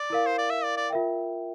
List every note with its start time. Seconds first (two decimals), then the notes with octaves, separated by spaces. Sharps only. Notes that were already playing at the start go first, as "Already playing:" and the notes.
Already playing: D5
0.10 E4 A#4 F5
0.27 C5
0.38 D5
0.50 E5
0.64 D5
0.77 D5
0.90 F4 A#4 E5 G5